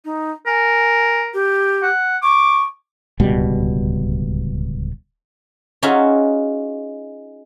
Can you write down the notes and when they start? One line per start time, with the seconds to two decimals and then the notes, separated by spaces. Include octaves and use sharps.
0.05 D#4
0.47 A#4 G#5
1.34 G4
1.83 F#5
2.23 C#6 D6
3.20 D1 C#2 B2 G3
5.82 C#4 D#4 F4 F#4 G#4 E5